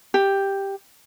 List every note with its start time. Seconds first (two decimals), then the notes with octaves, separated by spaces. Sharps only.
0.14 G4